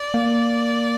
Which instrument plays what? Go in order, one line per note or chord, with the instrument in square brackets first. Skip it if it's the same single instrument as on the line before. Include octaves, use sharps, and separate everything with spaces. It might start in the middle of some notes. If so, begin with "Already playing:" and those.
Already playing: [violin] D5
[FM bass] A#3